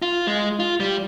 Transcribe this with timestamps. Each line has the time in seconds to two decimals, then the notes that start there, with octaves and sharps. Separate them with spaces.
0.02 F4
0.27 G#3
0.60 F4
0.80 G3